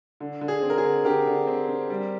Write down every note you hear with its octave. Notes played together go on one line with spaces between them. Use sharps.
D3
D3
G#4
C4
A#4
G#4
D3
D3 G4 A#4
D3
C4
C4
G3